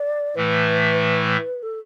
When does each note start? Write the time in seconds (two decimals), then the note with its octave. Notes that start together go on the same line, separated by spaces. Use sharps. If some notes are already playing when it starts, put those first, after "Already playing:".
Already playing: D5
0.36 A2 E3 A3 B4
1.62 A4